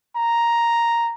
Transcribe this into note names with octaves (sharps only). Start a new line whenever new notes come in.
A#5